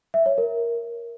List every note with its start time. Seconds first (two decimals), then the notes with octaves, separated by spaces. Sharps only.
0.14 E5
0.26 C#5
0.38 A#4